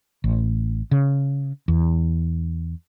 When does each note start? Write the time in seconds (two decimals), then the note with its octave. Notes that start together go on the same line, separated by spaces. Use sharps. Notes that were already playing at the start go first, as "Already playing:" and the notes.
0.24 A1
0.91 C#3
1.68 E2